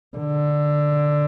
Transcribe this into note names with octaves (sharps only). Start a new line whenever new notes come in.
D3